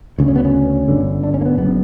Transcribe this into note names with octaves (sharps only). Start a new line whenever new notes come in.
D2 C#3
C#4
B3
C#4
G1 G2 D3
D4
C#4
A#3
B3
F#1 F#2 C#3 B3